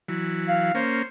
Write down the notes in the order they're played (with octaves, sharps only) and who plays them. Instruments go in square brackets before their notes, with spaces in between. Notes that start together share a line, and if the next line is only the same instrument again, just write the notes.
[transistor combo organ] E3 F#3
[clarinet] F5
[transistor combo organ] A#3 C#4 [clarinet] C5